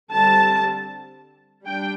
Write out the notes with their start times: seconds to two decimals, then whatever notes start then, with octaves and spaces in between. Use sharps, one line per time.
0.11 D3 G3 C4 A5
1.64 G3 D4 G5